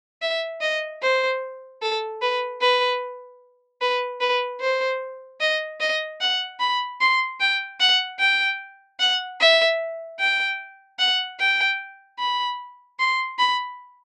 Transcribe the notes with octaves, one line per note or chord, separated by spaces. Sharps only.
E5
D#5
C5
A4
B4
B4
B4
B4
C5
D#5
D#5
F#5
B5
C6
G5
F#5
G5
F#5
E5
G5
F#5
G5
B5
C6
B5